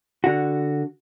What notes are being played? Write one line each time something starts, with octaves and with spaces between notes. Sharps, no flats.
D3 F#4